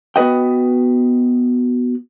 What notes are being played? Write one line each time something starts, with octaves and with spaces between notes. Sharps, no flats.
B3 F#4 B4 D#5 G5